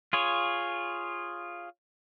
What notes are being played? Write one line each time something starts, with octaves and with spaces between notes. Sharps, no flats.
F4 G#4 C#5